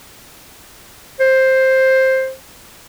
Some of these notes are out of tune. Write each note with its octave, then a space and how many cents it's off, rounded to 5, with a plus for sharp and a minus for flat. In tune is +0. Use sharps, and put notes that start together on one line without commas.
C5 +10